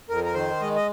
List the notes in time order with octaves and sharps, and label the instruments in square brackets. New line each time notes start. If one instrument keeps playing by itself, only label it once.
[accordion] F2 A#4
A#4
D#3 C5
G#3 D#5
D#5